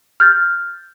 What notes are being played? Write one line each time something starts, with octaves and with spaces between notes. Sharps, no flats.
F6 G6 A6